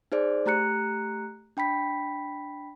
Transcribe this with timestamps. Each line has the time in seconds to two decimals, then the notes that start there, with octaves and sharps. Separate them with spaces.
0.12 D#4 G#4 C5 D5
0.46 A3 G4 A#5 F#6 C#7
1.57 D4 G5 B5 B6